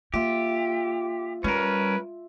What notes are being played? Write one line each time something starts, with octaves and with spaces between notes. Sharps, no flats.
A#3 F4 G4 E5
G3 C#4 A#4 B4